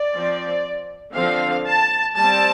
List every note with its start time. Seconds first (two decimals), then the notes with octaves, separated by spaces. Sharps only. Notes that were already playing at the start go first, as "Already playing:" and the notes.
Already playing: D5
0.13 F3 C4
1.14 D3 F3 C4 F5
1.66 A5
2.17 G3 C4 A5